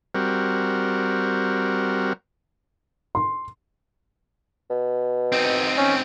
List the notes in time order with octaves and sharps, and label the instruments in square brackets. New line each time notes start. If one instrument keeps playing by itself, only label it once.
[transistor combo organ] G3 C4 F#4 A#4
[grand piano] C6
[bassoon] B2
[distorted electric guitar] C4 D#4
[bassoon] C#4